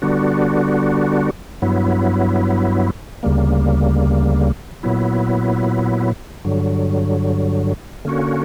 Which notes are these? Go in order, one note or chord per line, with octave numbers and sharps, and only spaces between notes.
D3 G3 B3 D4 F#4
G2 F#3 B3 E4
D2 C#3 G3 A#3
A#2 F#3 B3 E4
G2 D3 F#3
D3 A#3 C#4 F#4